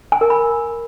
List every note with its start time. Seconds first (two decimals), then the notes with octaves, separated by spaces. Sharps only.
0.12 G#5
0.21 A#4
0.30 B5